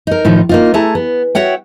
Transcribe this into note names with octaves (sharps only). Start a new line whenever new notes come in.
D#4 A#4
A2 D#3 F3 D#4
A#3 D#4 F4
A3 E4 G#4 A5 A#5
B3
F#4 C#5 E5 F#5 G5